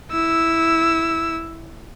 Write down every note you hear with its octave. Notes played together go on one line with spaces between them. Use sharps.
E4 E6